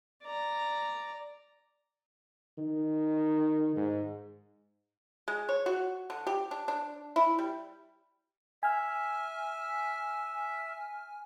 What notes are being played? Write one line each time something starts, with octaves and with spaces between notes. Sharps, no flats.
D5 A#5
D#3
G#2
G#3
C#5
F#4
D3
G4
D4
D4
E4
G3
E5 G#5 F6